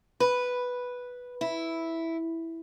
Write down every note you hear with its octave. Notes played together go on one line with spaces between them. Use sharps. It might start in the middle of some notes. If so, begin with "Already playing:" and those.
B4
E4